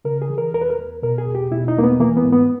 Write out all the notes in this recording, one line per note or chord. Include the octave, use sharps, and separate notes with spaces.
C#3 A#4
G#4
E3
A#4
E2 A#4
B4
A#4
E2
B2 A#4
G#4
E2
G4
B2 E4
D#4
E2 A#3
B3
E3 A#3
B3
G#2
B3